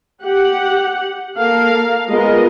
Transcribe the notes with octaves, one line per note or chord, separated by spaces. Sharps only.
G4 F#5
A#3 A4 A#4 F5
G#3 B3 F4 A#4 D#5